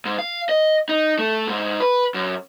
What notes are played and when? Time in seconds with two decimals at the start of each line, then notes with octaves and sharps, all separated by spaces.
0.05 G#2
0.19 F5
0.49 D#5
0.89 D#4
1.19 A3
1.48 G#2
1.80 B4
2.14 F#2